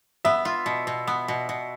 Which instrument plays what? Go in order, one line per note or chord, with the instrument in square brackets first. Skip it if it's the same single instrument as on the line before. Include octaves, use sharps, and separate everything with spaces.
[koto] B3 [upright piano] E5
[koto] F4
B2
B2
B3
B2
B2